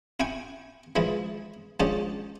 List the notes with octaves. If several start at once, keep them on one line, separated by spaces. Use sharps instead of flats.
E4 G5 G#5 C#6
E3 F3 G#3 E4
F3 G#3 C#4 D4 G4